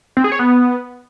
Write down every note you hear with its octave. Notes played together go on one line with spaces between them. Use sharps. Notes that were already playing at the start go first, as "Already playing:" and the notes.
C4
G#4
C#5
B3